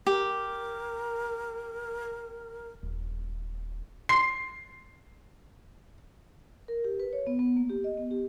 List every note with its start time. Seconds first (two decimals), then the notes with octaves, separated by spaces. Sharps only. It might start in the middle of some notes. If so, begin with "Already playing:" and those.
0.07 G4 A#4
2.83 D#1
4.09 C6 C7
6.68 A#4
6.84 G4
7.00 B4
7.13 C#5
7.27 B3
7.39 B3
7.57 A#3
7.69 G4
7.84 D#5
7.97 B3
8.11 G4